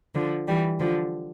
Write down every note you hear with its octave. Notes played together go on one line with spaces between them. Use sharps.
D3 F3
E3 G3
D3 F3